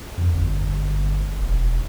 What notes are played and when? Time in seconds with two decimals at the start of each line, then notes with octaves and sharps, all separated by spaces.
0.17 F2
0.33 G1
1.41 E1